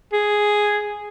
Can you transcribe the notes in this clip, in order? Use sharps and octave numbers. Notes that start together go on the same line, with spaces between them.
G#4